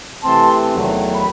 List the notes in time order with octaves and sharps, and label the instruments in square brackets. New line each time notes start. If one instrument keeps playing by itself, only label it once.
[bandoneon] C3 E3 A3 C4 [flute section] A5 C6
[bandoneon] E2 D#3 F#3 A3
[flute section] B5